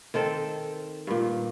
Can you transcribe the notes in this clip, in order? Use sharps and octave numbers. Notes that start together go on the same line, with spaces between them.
D#3 C4 A4
G2 A#2